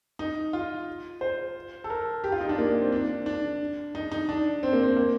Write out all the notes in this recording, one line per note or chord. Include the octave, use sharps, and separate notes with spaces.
D#4
F4
C5
A4
A#4
G4
F4
D#4
D4
A#3
A#3
C4
D4
D4
D#4
D#4
D4
C4
A#3
C4
A#3